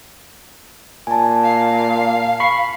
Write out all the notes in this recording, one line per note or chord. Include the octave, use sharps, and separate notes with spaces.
A#2 G#5 A5
F5
B5 C#6 C7